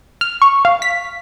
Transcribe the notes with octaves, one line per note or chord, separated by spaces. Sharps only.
F6
C#6
F5
B6